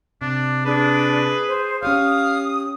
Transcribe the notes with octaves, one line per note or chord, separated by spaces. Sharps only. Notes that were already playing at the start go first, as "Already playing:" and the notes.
C3 D4
D4 G#4 B4
C5
C#4 G4 C#5 F5 D#6